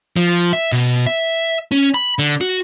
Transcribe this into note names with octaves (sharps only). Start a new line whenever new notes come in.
F3
E5
B2
E5
C#4
B5
D3
F#4